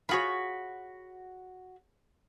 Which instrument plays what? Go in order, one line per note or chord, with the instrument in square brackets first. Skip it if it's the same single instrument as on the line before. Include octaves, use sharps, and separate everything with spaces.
[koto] F4 G#4 C#5 [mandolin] F#4 B5